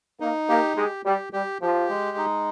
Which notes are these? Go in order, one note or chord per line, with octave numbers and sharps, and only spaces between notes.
A#3 D#4
A#3 G4
G#3 G4
G3 G4
G3 G4
F3 G4
G#3
D#4